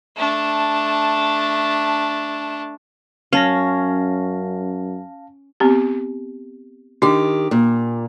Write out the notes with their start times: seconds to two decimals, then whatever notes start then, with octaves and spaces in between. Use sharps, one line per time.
0.16 A3 D4
3.33 F#2 C#4 F5 A5 A#6
5.60 B3 C4 G4
7.02 D#3 D4 G4
7.51 A#2